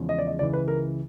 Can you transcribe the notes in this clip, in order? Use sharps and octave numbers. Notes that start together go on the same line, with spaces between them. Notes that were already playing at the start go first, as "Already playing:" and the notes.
Already playing: E2 C#3 F3 G#3
D#5
D5
D#5
C#2 C#3 E3 D5
B4
A#4